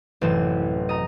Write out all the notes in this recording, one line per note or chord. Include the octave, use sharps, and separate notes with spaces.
A1 F#2 C3 E3 E7
D#5 A#5